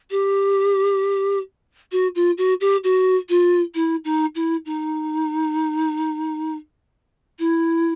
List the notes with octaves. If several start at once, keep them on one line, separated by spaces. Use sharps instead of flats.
G4
F#4
F4
F#4
G4
F#4
F4
E4
D#4
E4
D#4
E4